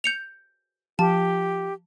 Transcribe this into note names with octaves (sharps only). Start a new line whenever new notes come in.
G6 C#7 F7
F3 G4 A5